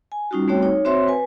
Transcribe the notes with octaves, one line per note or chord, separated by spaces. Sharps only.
G#5
G3 C#4 D#4 F4 F#4
G3 A3 C4 F#4 C#5 G5
D#4 C#5
C4 F#4 C5 C#5 E5 C6
B4 G#5